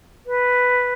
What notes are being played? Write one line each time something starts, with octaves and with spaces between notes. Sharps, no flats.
B4